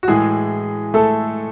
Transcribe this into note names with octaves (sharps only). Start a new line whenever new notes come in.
F#4
A2 E3 G#3 G#4
A3 A4